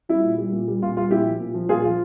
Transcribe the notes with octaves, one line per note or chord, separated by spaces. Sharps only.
G3 E4
A#2
G3
A#2
G3
A#2 F4
G3 F4
A#2 E4 G4
F3
A#2
F3
A#2 F4 G#4
F3 F4